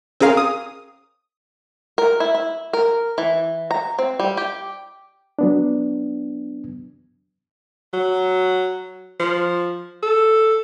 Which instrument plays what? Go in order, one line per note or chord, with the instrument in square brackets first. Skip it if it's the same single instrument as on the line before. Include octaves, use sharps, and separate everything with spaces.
[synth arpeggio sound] C4 C#4 G#4 A#4 F5
D#6
[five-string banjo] A#4
E4
E4
A#4
E3
A#5
C4
G3
G4
[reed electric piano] F#3 B3 D4
[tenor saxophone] F#3
F3
A4